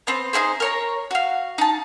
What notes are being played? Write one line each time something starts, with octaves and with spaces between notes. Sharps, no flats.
B3 C4 C5
D#4 E4 G#4 C5
A#4 C#5 A#5
F#4 F5
D#4 A5